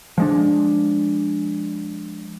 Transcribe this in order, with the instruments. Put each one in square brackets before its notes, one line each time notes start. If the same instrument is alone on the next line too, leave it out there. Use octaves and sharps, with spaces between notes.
[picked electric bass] F3 G#3 D4